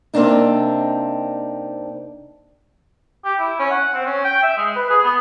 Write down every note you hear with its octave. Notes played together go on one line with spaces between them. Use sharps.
C3 A#3 C4 D4 D#4
G4
E4
C#4
F#5
C4
C#4
G5
E5
G#3
B4
G#4
B3